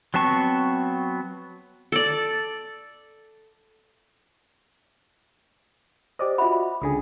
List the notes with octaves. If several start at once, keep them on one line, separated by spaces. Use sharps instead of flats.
F#3 B3 C4 A5 C#6
A4 D5
G4 C5 D5 D#5
F4 F#4 E5 B5
C#2 D3 C#4 G#4 D#6